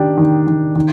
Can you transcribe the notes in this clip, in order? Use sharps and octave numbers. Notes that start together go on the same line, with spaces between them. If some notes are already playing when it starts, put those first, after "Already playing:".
Already playing: D#3 D4 G4
D#3
D#3
D#3